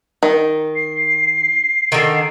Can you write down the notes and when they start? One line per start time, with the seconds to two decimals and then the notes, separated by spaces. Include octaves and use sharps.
0.23 D#3
0.76 C7
1.92 D3 D#3